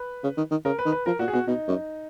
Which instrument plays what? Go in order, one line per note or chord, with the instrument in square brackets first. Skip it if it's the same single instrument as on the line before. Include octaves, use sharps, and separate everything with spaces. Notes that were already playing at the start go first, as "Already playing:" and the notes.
Already playing: [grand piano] B4
[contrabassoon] C#3
D#3
D#3
[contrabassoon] C#3 [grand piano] A#4
[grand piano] B4
[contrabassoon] D#3
[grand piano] B4
[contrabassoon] F3 [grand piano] A#4
[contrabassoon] A#2 [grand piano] F#4
[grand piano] G#4
[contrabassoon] B2 [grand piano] F#4
[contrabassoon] B2 [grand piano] D#4
[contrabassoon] F#2